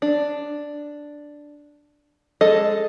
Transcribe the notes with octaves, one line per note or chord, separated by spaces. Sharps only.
D4
G#3 A4 D#5